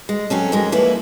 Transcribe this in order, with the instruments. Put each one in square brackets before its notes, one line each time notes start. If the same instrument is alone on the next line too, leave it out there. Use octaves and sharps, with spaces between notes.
[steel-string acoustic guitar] G#3
F#3 C4 C#4 A4
F2 G#3 A#4
F3 A#3 E4 B4